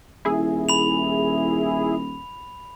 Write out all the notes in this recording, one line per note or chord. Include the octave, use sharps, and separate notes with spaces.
D#1 E4 G#4
B5 F7